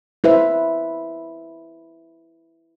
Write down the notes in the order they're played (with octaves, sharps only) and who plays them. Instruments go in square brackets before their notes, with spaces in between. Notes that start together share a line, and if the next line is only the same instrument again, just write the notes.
[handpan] E4 B4 C5 E5